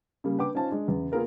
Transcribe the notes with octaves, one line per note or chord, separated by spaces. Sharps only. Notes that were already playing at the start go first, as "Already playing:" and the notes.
C#3 G3 A#3
D4 B4 G5 D6
C#4 D#4 F4 C5 A5
G#3 D4
E2 C#3
A#3 B3 F4 G#4 A#4 B4